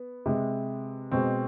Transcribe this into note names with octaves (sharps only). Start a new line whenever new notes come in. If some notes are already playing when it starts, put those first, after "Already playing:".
Already playing: B3
C3 G#3
B2 G#3 C4